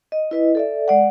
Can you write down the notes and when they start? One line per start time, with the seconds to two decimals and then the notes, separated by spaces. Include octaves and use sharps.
0.12 D#5
0.31 E4 B4 D#5
0.55 A4 D5 E5
0.88 G#3 D5 F#5